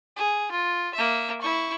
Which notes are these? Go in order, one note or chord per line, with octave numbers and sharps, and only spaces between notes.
G#4
F4
A#3 E5
E4 C#6